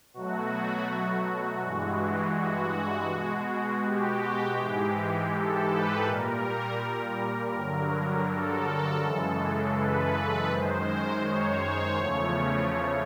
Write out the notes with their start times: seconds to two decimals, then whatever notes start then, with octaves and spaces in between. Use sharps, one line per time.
0.14 B2 F#3 A3 F#4
1.62 G2 E3 G#3
2.35 F#4
3.09 B2 G#3
3.83 G4
4.58 G#2 E3 G#3
5.32 A4
5.69 B4
6.06 A#2 G3 A#4
7.54 G2 D3 F#3
8.28 A4
9.02 F#2 C#3 E3 G#3
9.76 B4
10.13 B4
10.50 F#2 D#3 G#3 C5
11.24 C#5
11.98 E2 C#3 F3 A3